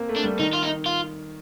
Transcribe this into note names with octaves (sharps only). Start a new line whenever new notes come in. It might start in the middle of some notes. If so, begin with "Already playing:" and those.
Already playing: A#3 C4
A3
D4
G3
D#3 D#4
F4
D#4
F4